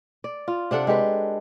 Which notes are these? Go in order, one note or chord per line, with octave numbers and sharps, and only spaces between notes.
D5
F4
C3 D4 A4 F#5
G#3 G4 A4 B4